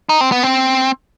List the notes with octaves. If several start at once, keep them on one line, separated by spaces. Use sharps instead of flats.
D#4
C4
B3
C4